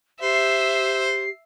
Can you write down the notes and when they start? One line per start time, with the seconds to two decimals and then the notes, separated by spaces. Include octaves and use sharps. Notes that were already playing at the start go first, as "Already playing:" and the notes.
0.22 G4 C5 E5 C7